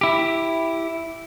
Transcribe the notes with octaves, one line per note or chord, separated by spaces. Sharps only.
E4 G4